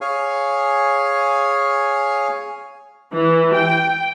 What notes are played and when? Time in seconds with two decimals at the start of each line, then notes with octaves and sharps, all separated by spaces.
0.01 G#4 C#5 F5 G#5
3.12 E3
3.55 G5